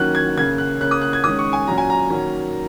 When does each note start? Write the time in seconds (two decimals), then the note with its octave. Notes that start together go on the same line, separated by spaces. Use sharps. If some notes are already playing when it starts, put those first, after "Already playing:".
Already playing: D#3 F#3 A#3 C#4 F#6
0.15 G#6
0.37 C#3 A#3 C#4 G#6
0.58 F#6
0.81 C#3 A#3 C#4 F#6
0.91 D#6
1.01 F#6
1.13 G#6
1.24 D#3 G#3 C#4 D#6
1.39 C#6
1.53 G#5
1.67 A#2 F#3 C#4 A#5
1.78 G#5
1.90 A#5
2.10 D#3 F#3 A#3 C#4